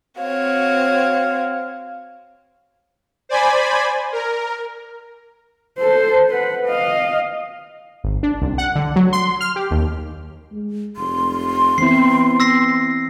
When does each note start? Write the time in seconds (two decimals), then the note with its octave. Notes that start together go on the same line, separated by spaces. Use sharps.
0.19 C4 F#4 C#5 F5
3.29 C5 D5 G#5 B5
4.12 A#4
5.78 A4 C5
6.29 B4 F#5
6.65 D#5 F5
8.04 G#1
8.23 D4
8.42 C2
8.58 F#5
8.75 D3
8.96 F#3
9.13 C6
9.41 F6
9.56 G4
9.71 D#2
10.52 G#3
10.96 F1 C6
11.78 E3 B3 C4 E4 C7
12.40 E6 A#6 C7